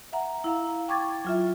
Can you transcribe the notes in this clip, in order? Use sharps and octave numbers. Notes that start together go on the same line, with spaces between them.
E5 F#5 A#5
E4 F5 A#5
G5 C#6 D6 G#6 A6
F#3 F4 E5